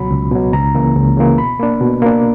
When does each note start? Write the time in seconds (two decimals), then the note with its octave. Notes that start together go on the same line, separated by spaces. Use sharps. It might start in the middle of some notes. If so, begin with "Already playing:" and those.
Already playing: C#2 B2 F#3 B5
0.10 C#2
0.31 B2 F#3
0.53 C#2 A#5
0.74 C#3 E3 A#3
0.95 C#2
1.17 C#3 E3 A#3
1.38 B2 B5
1.60 A#3 D4
1.80 B2
2.02 A#3 D4